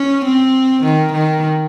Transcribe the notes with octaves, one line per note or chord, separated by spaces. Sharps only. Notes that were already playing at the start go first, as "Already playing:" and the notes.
Already playing: C#4
C4
D#3
D#3